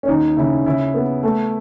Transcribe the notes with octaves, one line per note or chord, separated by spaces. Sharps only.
C#4
D#2 D#4
C#3 E4
C#3 E4
B3
A3